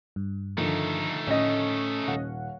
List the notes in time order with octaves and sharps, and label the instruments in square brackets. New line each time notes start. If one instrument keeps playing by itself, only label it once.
[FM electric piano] G2
[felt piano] D3 D#3 F3 [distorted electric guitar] A3 D#4
[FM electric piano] A2 [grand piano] C#4 D#5
[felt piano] D#1 [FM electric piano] C#5 F5 F#5